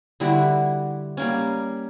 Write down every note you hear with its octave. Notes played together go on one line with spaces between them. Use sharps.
D3 G3 E4 F#4
G3 A#3 C#4